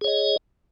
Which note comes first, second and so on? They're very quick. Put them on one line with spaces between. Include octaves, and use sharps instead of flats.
G#4 C#5 D#5